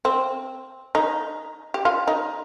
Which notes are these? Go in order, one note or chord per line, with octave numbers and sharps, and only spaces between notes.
C4
D#4
G4
F4
D#4